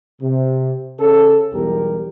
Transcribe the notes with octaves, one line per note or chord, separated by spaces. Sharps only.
C3
C#3 C#4 A4
B1 E2 G3 G4 A#4